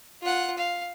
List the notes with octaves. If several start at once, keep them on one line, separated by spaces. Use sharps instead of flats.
F4 F#5
F5